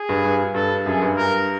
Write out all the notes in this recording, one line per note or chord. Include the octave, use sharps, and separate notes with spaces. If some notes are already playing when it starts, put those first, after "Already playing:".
Already playing: G#4
G2
G2
G2 A4
F#2 G#4
G2
A#4